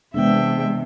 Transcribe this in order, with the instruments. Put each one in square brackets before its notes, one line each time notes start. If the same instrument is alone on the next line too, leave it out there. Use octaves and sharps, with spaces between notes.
[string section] C3 [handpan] E3 B3 D4 [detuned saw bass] G#3 [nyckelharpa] E5 G5